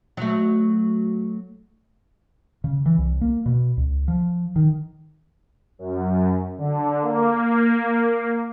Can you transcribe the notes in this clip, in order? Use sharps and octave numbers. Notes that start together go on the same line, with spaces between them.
F#3 A3
C#3
E3
C2
A#3
B2
C#2
F3
D#3
F#2
D3
A#3